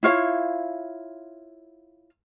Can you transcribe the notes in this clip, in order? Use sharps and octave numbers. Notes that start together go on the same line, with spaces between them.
E4 F4 C#5 F5